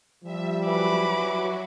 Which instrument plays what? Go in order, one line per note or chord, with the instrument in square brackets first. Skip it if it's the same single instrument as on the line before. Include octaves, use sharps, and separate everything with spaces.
[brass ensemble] F3 G3 [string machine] E5
[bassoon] E3 [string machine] F#3 F#4 [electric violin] B5 D6